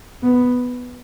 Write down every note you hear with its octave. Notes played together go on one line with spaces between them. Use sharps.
B3